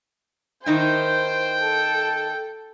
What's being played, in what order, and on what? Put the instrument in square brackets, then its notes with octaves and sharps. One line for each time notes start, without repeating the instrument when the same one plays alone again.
[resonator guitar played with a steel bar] D#3 D#4 E4 [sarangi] C5 [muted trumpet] G5
[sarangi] A4